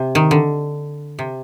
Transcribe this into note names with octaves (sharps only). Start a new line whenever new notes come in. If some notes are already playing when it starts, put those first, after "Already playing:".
Already playing: C3
D#3
D3
C3